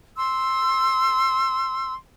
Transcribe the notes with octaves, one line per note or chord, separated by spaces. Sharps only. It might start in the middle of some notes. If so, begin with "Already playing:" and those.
C6 E6